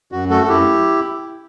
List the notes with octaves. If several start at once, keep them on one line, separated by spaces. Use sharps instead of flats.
F#2 F#4
A3 F#4 A4
A4
F#2 E4 G4